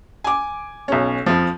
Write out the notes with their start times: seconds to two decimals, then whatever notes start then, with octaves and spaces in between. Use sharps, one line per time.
0.24 G#5 D6
0.88 B1 C#4
1.26 F2 F3